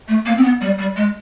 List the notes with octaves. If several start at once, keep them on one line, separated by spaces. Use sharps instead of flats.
A3
A#3
C4
B3
G3
G3
G#3